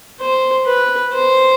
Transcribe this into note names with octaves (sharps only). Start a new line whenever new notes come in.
C5
B4
C5